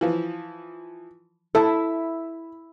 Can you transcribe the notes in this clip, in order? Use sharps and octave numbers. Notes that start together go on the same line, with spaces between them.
E3 F3
E4 A4 E5